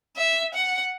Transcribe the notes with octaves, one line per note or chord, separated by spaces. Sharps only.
E5
F#5